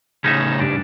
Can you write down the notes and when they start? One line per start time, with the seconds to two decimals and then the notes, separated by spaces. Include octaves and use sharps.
0.24 A2 C#3 C#4 D#4 E5
0.60 G2 D4